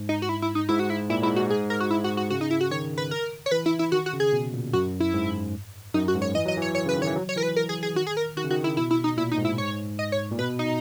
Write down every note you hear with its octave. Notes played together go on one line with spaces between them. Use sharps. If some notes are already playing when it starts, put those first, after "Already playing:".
Already playing: G#2
D#4
F#4
E4
E4
D#4
G#2 E4
F#4
E4
A#2 E4
G#2 E4
G#2 F#4
G#4
A#4
F#4
E4
F#4
F#4
C#3 F#4
D#4
E4
F#4
D#3 C#5
B4
A#4
C#5
E3 B4
E4
E4
D#3 F#4
F#4
C#3
G#4
B2
A#2
F#2 F#4
E4
G#2
F#2 D#4
F#4
G#2
C#5
E3 D#5
F#3 D#5
E3 C#5
C#5
C#3 B4
D#3
C#5
E3
F#3
C#5
E3 A#4
B4
A#4
G#4
G#4
D#3 F#4
G#4
A#4
D#3 F#4
C#3
D#3 F#4
E4
B2 E4
E4
D#4
A#2 E4
D#4
G#2
E4
C#5
D#5
C#5
A#2
B2 B4
D#4